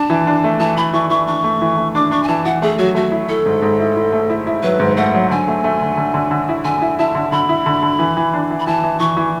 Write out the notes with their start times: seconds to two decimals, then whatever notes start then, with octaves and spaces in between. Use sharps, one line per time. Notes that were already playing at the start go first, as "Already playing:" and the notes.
Already playing: D4 A5
0.10 E3
0.27 D4
0.44 A3
0.60 E3 A5
0.77 E3 B5
0.93 E3 C#6
1.10 E3 C#6
1.27 D4 C#6
1.44 A3
1.61 E3
1.77 A3
1.95 D4 D6
2.11 D4 C#6
2.23 G#5
2.28 E3 A5
2.45 E3 F#5
2.62 A3 G#4
2.78 F#3 F#4
2.95 A3 F#4
3.12 E4
3.29 E4 A4
3.46 G#2
3.62 G#2
3.80 E4
3.96 E4
4.13 A3
4.30 E4
4.47 E4
4.63 F#3 B4
4.80 G#2
4.97 A3 F#5
5.14 F#3
5.31 D3 G#5
5.48 A3
5.64 A3
5.81 D3
5.97 D3
6.14 D3
6.31 D3
6.49 E4
6.64 D3 G#5
6.82 E4
6.99 E4 A5
7.15 D3
7.32 D3 B5
7.49 E4
7.66 D3
7.83 D3
7.99 E3
8.17 E3
8.34 D4
8.50 E3
8.60 B5
8.67 E3 A5
8.84 E3
9.00 E3 C#6
9.17 E3